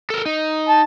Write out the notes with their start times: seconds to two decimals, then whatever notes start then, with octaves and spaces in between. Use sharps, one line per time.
0.10 A4 A#4
0.26 D#4
0.69 A5